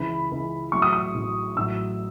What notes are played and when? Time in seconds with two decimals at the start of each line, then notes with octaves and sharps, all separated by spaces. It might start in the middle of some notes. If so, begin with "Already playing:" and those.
Already playing: C#2 C#3 E3 B5
0.31 C#2 C#3 E3
0.72 A1 A2 F#3 C#6
0.82 D#6
0.93 D#6
1.14 A1 A2 F#3
1.56 A1 A2 F#3 E6